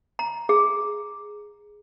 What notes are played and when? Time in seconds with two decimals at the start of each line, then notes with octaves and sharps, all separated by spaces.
0.19 A#5
0.49 G#4